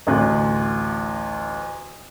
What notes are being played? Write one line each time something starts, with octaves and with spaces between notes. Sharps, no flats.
A1 D2 F#6